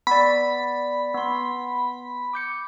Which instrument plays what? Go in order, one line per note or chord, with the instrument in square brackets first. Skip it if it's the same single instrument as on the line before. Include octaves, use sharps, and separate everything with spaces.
[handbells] B3 D5 [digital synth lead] B5
[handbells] B3 C6
D6 G6 C#7